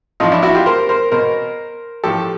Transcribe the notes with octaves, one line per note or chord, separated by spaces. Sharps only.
A2 F3 D#4 F4
D4 E4
E4 F#4
F4 G4
A#4 C5
A#4 C5
B2 A#4 C5
A2 F3 G4 A4